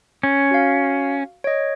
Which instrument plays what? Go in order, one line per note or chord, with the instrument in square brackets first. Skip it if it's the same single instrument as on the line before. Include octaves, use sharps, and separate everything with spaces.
[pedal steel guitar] C#4
[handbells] F#4 F5
C#5 D#5